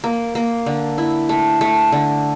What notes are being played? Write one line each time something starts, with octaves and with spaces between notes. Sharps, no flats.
A#3
A#3
D3
E4
A3
A3
D3